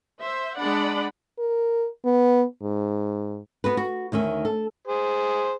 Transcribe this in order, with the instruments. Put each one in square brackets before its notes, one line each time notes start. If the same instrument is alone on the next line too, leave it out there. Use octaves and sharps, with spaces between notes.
[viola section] C5 E5
G#3 D4 D5 F#5 B5
[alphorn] A#4
B3
G#2
[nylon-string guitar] B3 F#4 B4
F#4
D2 D#3 C#4 E5
A4
[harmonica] G#4 C5